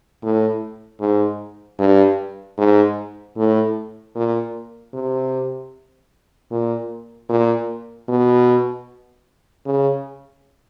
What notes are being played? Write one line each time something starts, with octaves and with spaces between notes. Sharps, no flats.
A2
G#2
G2
G#2
A2
A#2
C3
A#2
A#2
B2
C#3